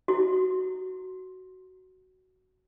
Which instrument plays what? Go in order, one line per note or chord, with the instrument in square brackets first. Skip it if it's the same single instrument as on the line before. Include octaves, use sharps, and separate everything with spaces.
[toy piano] E4 F#4